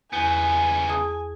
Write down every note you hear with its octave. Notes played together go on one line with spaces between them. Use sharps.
E2 C#3 B3 G#5
G#4 A5 D#6